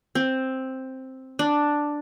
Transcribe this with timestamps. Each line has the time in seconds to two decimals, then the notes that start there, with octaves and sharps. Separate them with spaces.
0.15 C4
1.39 D4